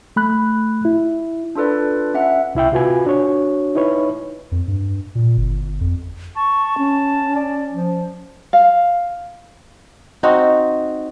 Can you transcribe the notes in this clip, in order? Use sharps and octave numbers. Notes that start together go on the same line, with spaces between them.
A3 B5 F#6
E4
D4 F4 A4 B4 D5
C#4 E5 F#5
C2 E4 E5 G5
C3 F4 F#4 B4 G#5
D4 F#4 C#5
D#4 E4 B4 C#5
F2
G2
A#2
G1
F2
A5 C#6
C#4
D5
F3
F5
C4 D#4 F#4